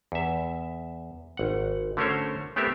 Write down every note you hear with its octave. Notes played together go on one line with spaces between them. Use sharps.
E2 E5
G#1 F#5
D3 A3 C#4 A#4 C5 C#5
A3 B3 C4 G4 A#4 E5